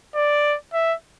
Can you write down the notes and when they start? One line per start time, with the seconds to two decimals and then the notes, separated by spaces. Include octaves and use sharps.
0.15 D5
0.73 E5